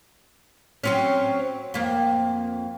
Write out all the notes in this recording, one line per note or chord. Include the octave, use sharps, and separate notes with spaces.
F#3 C4 C#4
F2 A#3